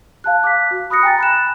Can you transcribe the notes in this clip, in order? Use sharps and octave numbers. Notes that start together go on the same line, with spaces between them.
F5 A5 F#6
D6 F#6 B6
F#4
B5 D#6 F#6 A#6 C#7
G5 G#5 A#5 A6
B5 F#6 E7